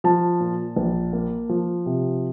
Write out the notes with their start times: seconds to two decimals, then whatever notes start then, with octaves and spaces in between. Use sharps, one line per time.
0.04 F3 A5
0.40 A#2
0.76 A#1
1.13 A#3
1.49 F3
1.86 C3